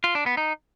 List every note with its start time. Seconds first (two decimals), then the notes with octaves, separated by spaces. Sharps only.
0.04 F4
0.15 D4
0.26 B3
0.37 D#4